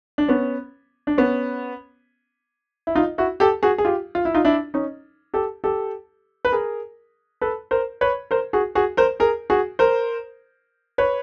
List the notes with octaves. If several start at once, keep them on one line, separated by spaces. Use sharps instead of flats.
D4
B3 C#4
D4
B3 C#4
E4
D#4 F4
E4 F#4
G4 A4
F#4 G#4
G#4
F4 G4
F4
E4
D#4 F4
D4 E4
C#4 D#4
G4 A4
G4 A4
B4
G#4 A#4
A4 B4
A#4 C5
B4 C#5
A#4 C5
F#4 G#4
F#4 G#4
A#4 C5
G#4 A#4
F#4 G#4
A#4 C5
B4 C#5